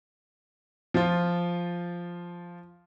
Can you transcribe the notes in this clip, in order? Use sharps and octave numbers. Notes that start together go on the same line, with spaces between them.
F3 F4